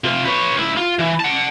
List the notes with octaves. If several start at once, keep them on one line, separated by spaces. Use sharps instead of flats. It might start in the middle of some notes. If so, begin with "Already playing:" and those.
C3 F4
B4 C#5
C#2 E4
F4
E3
F#5 A5